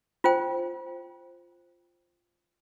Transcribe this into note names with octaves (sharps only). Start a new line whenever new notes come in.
F4 C5 G5